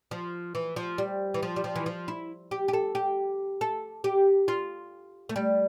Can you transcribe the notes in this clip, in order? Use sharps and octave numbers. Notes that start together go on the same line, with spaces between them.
F3
E3
F3
G3
E3
F3
G3
F3
E3
F3
E4
G4
G4
A4
G4
A4
G4
F4
A3
G3